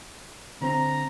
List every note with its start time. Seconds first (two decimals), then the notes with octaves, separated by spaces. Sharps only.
0.62 D3 C4 A#5